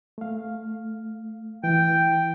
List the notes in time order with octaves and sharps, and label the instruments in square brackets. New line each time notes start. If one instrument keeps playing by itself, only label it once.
[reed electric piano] A3 F5
[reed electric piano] E3 [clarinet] G5